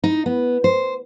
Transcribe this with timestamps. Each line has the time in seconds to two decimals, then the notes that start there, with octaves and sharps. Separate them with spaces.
0.04 D#4
0.26 B3
0.64 C5